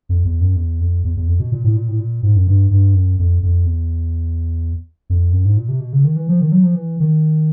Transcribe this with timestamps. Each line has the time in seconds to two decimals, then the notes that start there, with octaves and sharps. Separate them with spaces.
0.09 F2
0.25 E2
0.41 F#2
0.56 E2
0.80 F2
1.04 E2
1.17 E2
1.28 F2
1.40 B2
1.52 A#2
1.64 A2
1.76 A#2
1.88 A2
2.00 A#2
2.23 G#2
2.36 F#2
2.47 G2
2.71 G2
2.94 F#2
3.19 F2
3.43 F2
3.66 E2
5.10 F2
5.32 F#2
5.45 G#2
5.57 A#2
5.69 C3
5.80 B2
5.93 C#3
6.04 D#3
6.16 E3
6.29 F3
6.41 D#3
6.52 F#3
6.64 F3
6.75 E3
7.00 D#3